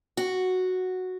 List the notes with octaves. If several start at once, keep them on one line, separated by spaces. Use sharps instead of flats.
F#4